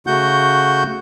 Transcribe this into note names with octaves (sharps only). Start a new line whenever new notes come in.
C#3 A3 F#4 F#5 G6